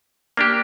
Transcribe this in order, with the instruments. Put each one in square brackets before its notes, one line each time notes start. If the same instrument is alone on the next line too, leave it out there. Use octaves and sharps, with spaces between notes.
[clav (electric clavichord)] A#3 D4 G4